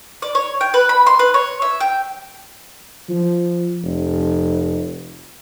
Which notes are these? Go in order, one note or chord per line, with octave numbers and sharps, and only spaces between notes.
D5
C#5
G5
B4
B5
C6
B4
C#5
E5
G5
F3
F1